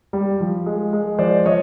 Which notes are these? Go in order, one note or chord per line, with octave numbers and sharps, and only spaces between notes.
G3
F3
G#3
G#3
F3 C5 D5
F3 C#5 D#5